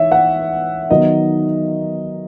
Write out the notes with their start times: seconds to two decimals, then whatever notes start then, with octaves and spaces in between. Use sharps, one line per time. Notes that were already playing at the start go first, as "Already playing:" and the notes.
Already playing: E3 D#4 C#5 E5
0.12 F#5
0.90 D#3 F#3 B3 D#4 D#5